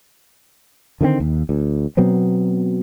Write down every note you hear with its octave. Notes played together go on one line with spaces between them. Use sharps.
D3 D#3 G3 C4
D#2
D2
B2 F#3 B3 C4